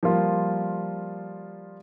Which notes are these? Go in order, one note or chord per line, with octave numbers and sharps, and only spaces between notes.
F3 G3 A#3 F4